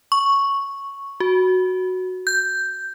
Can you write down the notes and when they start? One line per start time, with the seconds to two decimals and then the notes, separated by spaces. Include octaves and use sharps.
0.12 C#6
1.20 F#4
2.27 G6